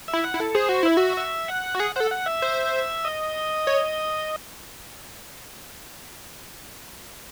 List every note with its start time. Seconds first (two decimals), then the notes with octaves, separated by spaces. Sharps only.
0.08 E5
0.13 E4
0.24 F#5
0.34 E4
0.40 A4
0.55 G#4 C5
0.69 F#4
0.83 E4 E5
0.97 F#4
1.17 E5
1.48 F#5
1.75 F#4
1.80 G#4 F#5
1.96 C5 F#5
2.00 A4
2.11 F#5
2.26 E5
2.42 C5
3.05 D#5
3.67 C#5